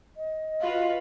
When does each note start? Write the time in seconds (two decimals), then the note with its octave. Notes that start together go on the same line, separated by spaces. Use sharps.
0.17 D#5
0.61 F4 F#4 B4 F5